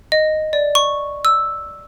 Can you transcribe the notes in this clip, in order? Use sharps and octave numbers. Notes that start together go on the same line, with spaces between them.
D#5
D5
C#6
E6